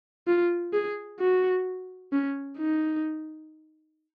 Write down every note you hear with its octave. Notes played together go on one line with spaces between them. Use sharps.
F4
G#4
F#4
C#4
D#4